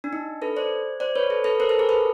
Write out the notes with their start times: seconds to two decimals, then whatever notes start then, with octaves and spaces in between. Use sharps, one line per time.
0.04 D4
0.13 D#4
0.42 A4 B4
0.56 C5 D5
1.00 C5 D5
1.16 B4 C#5
1.30 A4 B4
1.44 A4 B4
1.60 A#4 C5
1.69 A4 B4
1.79 G#4 A#4
1.89 A4 B4